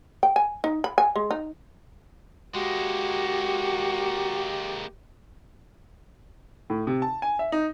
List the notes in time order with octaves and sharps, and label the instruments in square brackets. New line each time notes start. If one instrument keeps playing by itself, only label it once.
[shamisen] G5
G#5
D#4
B5
G#5
G#3
D#4
[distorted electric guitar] G#3 A#3 [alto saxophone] F#4 [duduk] G4
[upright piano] A2
C3
A5
G#5
E5
D#4